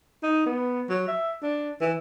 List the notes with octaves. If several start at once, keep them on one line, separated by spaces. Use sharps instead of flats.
D#4
B3
F#3
E5
D4
E3